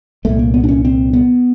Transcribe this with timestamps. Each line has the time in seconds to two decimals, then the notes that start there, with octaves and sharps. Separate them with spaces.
0.25 C2 A#2 A3
0.39 A#3
0.54 B3
0.64 D4
0.69 C#4
0.85 C4
1.13 B3